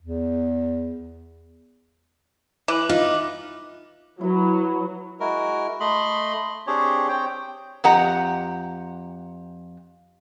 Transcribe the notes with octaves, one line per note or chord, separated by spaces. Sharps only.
E2
E3 D6 F#6 F#7
D#4 F4
F#3 E4 B4
G#3 E4 F#4 A#4
A3 D#5 B5 C6
C4 D4 G4 G#4 C#5
C4 C#5 G5
F2 G4 F#5 A#5